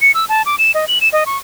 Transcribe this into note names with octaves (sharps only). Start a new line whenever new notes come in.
C#7
E6
A5
D6
E7
D#5
F#7
E7
D#5
C#6